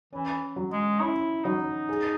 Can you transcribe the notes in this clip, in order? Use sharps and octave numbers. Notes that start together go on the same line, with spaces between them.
E3 C#4
F#3
G#3
C#4 E4
F#3 D#4
G#4